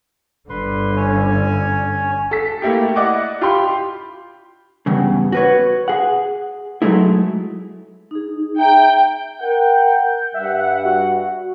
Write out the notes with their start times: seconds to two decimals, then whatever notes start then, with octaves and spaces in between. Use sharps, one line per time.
0.49 G1 D3 B4 C6
0.96 C#4 C#5 G#5
2.31 A4 B6
2.62 A3 A#3 E4 G4
2.96 E4 D5 D#5 F#5 D6
3.41 F4 G4 B5 C6
4.86 E2 G2 C#3
5.32 F#4 B4 C#5
5.88 G#4 F#5
6.82 F#3 G#3 A3 E4
8.11 D#4 G#4
8.58 E5 G5 A#5
9.40 A#4 F#5 G5 G6
10.34 G2 E5 F#5
10.85 F#4